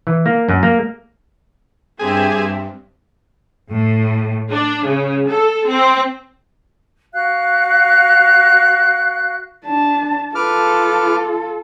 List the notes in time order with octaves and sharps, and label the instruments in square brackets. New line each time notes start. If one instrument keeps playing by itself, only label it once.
[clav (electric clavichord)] E3
A#3
F#2
A#3
[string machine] G2 [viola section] C4 E5 [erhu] G4 [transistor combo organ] G#4
[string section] A2
D4
C#3
A4
C4
[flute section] F#4 F5 F#6
[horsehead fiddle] D4 A5
[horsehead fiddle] F4 A4 [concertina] B4 D6 F6